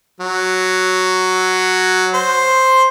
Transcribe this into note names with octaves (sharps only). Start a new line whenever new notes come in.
F#3
C5